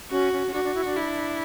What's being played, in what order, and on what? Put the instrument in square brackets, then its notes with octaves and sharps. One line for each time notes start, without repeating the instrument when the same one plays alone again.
[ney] C#4 [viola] F#4
[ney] C#4
C#4
[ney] D4 [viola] F#4
[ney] D4
E4
D4
[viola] E4